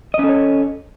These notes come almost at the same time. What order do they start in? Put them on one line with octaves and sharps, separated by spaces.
D#5 C#4 A4 C#5